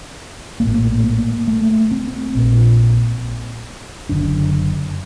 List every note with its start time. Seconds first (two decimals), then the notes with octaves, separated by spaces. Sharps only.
0.60 A#1 A2 A#3
1.04 A#3
1.48 A3
1.91 C4
2.35 A#1 A#2
4.09 F#1 F#2 D3 D4